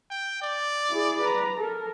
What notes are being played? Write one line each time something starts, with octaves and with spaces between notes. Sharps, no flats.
G5
D5
E4 G#4
B4 A#5
A4 A#4